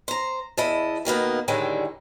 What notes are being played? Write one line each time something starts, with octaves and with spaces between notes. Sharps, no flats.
C5 A#5
E2 E4 D#5 A5
B2 D#3 A#3 B3
A2 D3 D#3 G3 G#3